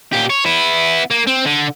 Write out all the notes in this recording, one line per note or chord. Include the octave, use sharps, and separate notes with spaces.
A#2 G4
C#5
B3 E4
A#3
C4
D3